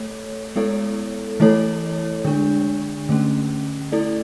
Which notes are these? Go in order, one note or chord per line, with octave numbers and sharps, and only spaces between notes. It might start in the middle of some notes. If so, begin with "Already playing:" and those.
Already playing: A3 A4 C#5
G#3 B3 E4 A4 C#5
E3 A3 E4 A4 C#5
D3 G#3 D4
D3 A3 C#4
A3 E4 A4 D5